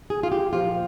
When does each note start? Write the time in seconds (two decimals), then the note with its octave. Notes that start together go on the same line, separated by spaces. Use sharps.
0.10 G#4
0.23 F4
0.32 G4
0.53 A#2 F3 F4